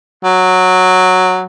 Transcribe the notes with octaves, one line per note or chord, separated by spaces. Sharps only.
F#3